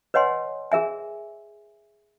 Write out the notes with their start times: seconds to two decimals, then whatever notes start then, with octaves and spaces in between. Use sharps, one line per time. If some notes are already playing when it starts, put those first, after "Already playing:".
0.14 B4 C#5 D#5 F#5 G#5 C6
0.72 G#4 A#4 E5 G#5